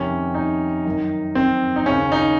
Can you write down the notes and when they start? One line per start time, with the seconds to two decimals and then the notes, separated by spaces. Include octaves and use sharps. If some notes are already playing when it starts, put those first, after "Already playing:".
Already playing: F2 C3 D#3 C#4
0.34 D#4
0.85 F#2 D#3
1.35 C4
1.76 D#4
1.86 D#2 C#3 C#4
2.12 D#4